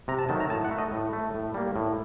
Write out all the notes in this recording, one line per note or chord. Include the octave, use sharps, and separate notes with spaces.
C3 A#5
A5
D#3 F#3 A3 A5
A#5
A2 A5
F#5
A3
D#5
A2
A3
A2
G3 A#3
A2